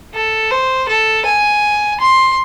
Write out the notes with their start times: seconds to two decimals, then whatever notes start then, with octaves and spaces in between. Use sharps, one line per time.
0.14 A4
0.51 C5
0.89 A4
1.26 G#5
2.00 C6